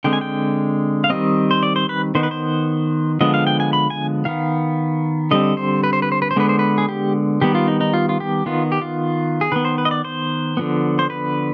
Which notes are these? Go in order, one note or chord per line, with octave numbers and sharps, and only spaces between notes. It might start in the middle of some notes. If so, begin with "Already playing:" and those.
D3 G#3 C4 G5
G#5
G5
F5
D#3 G3 C4 D#5
C5
D5
C5
B4
D#3 B3 C5
B4
C5
D3 F3 G#3 B3 D#5
F5
G5
G#5
B5
G#5
D#3 B3 F5
D3 G3 C4 D#5
C5
B4
C5
B4
C5
B4
C5
D3 G#3 B3 B4
C5
B4
G#4
G4
D#3 G3 B3 G4
F4
D#4
D#4
F4
F4
G4
D#3 B3 F4
G4
F4
G#4
D#3 B3 B4
C5
B4
D#5
D5
C5
D3 F3 B3
C5
B4